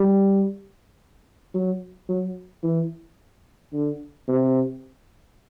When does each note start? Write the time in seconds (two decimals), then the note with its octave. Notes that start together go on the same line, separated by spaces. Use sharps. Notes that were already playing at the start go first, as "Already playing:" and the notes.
Already playing: G3
1.55 F#3
2.09 F#3
2.63 E3
3.73 D3
4.28 C3